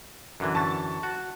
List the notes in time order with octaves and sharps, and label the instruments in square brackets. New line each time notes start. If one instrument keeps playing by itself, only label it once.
[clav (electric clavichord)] F#2 D3 E3
[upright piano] A5 C#6 A6
[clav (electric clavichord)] F#4